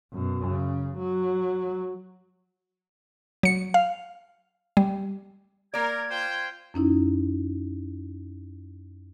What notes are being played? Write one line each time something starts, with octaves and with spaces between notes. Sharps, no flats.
F#2 B2
C#3
F#3
F#3 C#7
F5
G3
A#3 A#4 D5 G#6
F4 C5 G5
F#2 C#4 D#4 E4